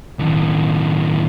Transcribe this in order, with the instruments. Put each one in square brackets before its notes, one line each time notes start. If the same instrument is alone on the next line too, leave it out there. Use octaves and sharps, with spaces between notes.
[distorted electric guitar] D#2 A2